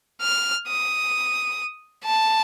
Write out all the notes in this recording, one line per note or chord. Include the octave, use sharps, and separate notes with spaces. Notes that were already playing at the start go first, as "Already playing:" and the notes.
F6
D#6
A5